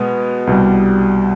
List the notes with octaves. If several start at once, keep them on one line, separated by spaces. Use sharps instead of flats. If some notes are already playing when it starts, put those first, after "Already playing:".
Already playing: B2 G#3 B3
C2 B2 G3